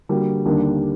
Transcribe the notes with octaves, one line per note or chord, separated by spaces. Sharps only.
D3 G3 A#3 F#4
D#2 D3 G3 A#3 D4